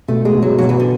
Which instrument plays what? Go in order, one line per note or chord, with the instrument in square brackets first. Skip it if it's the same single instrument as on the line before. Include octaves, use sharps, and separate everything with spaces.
[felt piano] B2 [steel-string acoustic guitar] A3
[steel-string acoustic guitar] G#3
[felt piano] B2
[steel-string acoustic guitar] F#3
[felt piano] B2 [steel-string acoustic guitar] F#3
[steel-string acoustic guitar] E3
D3